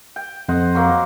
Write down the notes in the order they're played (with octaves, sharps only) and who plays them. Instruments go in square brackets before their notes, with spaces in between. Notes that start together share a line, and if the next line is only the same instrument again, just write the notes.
[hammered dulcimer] G5
[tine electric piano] F2 [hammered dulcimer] C5 D#5 F#5
[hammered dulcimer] F#3 A#3